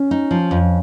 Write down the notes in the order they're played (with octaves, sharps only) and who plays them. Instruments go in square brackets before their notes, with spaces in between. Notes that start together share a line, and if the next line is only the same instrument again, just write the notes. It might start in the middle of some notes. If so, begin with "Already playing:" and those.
Already playing: [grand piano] C#4
[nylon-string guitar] D#4
F3
F2